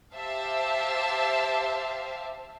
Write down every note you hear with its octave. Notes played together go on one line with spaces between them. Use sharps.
G4 C5 E5 F5 A5